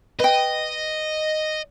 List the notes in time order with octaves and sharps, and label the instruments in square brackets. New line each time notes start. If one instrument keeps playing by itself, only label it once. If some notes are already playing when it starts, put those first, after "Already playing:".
[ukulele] B4 G5 [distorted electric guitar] D#5